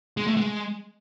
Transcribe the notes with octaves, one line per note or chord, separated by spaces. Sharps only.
G#3
A3
G#3